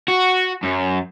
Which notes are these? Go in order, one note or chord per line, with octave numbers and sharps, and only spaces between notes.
F#4
F#2